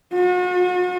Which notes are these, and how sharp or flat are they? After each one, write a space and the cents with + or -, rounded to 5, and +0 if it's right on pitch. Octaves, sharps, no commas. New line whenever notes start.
F#4 -40